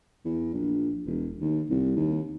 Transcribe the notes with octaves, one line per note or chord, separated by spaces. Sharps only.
E2
A#1
E1
D#2
C2
D#2